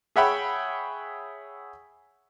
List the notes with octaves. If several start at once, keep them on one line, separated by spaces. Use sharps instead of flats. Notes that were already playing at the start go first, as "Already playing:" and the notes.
G#4 C#5 E5 F#5 G5 B5